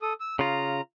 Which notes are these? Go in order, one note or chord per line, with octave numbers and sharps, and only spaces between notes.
A4 D#6
E6
C#3 F4 A#5